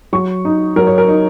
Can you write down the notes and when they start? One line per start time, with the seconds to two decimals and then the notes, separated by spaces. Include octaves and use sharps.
0.13 F#3 C#6
0.45 D#4
0.76 F#3 A#4
0.87 C#5
0.98 A#4
1.08 D#4